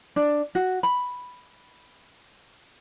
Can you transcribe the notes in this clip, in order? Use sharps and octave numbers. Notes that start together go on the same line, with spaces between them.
D4
F#4
B5